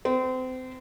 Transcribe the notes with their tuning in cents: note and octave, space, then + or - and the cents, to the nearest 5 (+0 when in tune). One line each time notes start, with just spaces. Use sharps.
C4 -30